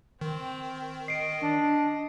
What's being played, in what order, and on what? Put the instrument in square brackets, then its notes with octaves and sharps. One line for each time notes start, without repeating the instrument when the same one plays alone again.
[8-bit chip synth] D#3 [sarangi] C4
[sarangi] D#5 [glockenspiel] C7 D7
[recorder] D4